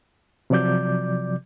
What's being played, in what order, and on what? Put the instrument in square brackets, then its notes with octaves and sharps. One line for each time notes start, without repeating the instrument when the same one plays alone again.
[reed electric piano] C3 F3 F#3 D5 D6 G6